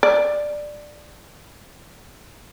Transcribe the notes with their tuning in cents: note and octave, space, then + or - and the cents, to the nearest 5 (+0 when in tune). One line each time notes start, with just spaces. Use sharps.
D5 +10